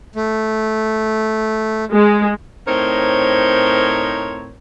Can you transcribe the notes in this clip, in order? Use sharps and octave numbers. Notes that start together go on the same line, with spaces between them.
A3
G#3
A2 C4 D#4 A#4 C5 C#5